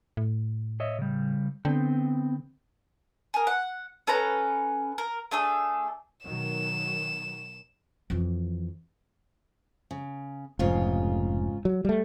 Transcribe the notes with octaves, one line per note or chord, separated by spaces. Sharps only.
A2
C#5 D#5 E5
C#3 G3
D3 B3 C4 G5
G#4 A#4
F#5
C#4 A4 B4 A#5
A#4
A3 D4 G#4 A4
B2 D#3 F#3 E7
F2 E3
C#3
F1 G#2 C#3 F4
F#3
G3 A3